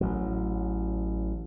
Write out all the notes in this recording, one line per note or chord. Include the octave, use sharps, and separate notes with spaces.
A1 F#3